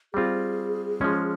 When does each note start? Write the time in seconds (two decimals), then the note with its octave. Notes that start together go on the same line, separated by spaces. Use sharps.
0.14 G3 C4 F4 G#4
1.01 F3 G#3 C#4